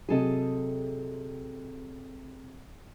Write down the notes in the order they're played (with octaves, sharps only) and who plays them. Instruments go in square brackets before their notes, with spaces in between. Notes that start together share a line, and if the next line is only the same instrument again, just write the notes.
[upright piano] C3 F#3 [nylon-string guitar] G#4 A4 D#5